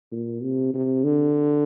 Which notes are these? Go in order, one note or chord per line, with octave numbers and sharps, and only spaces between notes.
A#2
C3
C3
D3